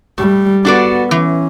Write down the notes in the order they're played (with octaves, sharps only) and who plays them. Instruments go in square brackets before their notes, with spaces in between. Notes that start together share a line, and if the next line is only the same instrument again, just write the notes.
[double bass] G3 [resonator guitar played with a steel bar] A3
[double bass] B3 [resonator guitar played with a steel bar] D4 F#4 A4 D5
[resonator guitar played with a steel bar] E3 [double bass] C#4